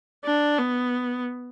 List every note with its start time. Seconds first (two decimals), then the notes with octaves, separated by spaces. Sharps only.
0.25 D4
0.59 B3